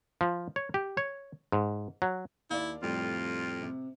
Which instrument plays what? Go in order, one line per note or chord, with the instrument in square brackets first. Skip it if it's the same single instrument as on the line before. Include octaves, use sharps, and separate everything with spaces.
[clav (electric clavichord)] F3
C#5
G4
C#5
G#2
F#3
[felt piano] D#2 [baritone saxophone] E4 [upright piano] D5 F5
[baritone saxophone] F2 [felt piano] A2 G3 [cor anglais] F4
[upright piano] C3